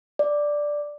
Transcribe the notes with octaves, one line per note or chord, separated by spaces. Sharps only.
D5